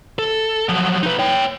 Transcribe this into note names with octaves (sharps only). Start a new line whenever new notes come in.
A4
F3 F#3
D#4 B4
C#5 G5